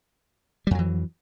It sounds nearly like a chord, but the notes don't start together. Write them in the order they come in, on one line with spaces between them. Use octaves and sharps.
G3 F2 F#3 E3